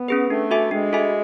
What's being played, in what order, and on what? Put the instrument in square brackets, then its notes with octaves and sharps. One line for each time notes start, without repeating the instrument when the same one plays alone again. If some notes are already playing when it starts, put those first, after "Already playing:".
Already playing: [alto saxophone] B3
[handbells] C#4 G#4 B4
[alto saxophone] A3 [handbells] D4
[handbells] F#4 A4 E5 G#5
[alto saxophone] G#3 [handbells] D4
[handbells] F#4 A4 E5 G#5